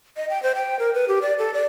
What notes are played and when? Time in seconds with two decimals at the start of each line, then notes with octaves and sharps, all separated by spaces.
0.17 D#5
0.30 G5
0.43 C5
0.55 G5
0.79 A#4
0.94 B4
1.08 G4
1.22 D5
1.39 A4
1.54 D5